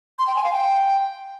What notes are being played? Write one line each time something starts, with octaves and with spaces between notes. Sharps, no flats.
C6
G5
G#5
F5
G5